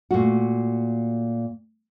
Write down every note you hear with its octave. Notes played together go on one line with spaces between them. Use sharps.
A#2 A3 F#4